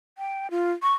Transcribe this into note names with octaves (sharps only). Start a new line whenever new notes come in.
G5
F4
C#6